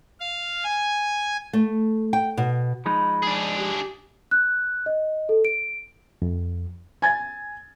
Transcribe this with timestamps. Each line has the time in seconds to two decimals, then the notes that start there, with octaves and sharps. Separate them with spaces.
0.19 F5
0.64 G#5
1.53 A3
2.13 G5
2.37 B2
2.86 F3 G#3 D#4 B5
3.23 D4 G#4
3.58 G4
4.31 F#6
4.86 D#5
5.29 A4
5.45 D7
6.22 F2
7.02 G#5 G#6 A6